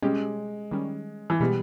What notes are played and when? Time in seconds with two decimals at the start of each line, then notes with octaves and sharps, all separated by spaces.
0.02 B2 G3 G#3 C#4 G4
0.71 D#3 G3 C#4
1.30 E3
1.40 B2 G3 G#3 B3